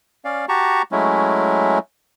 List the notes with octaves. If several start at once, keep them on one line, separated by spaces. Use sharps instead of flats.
C#4 D5 F5
F#4 G4 A5 A#5 C#6
F#3 G#3 A3 C#4 E4